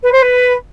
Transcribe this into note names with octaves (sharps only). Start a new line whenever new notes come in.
B4
C5
B4